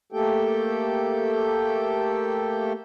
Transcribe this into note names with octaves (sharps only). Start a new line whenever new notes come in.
A3 A#3 G4 A4 G5